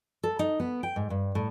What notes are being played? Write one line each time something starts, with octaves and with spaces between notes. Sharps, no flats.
A4
D#4
B3
G5
G#2
G2
A2